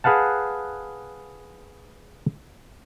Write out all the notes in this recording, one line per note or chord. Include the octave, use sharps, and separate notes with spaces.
G#4 B4 F5 F#5 A5